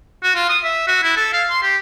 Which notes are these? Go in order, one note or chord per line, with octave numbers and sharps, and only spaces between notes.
F#4
F4
D#6
E5
F#4
E4
A4
F5
C6
G4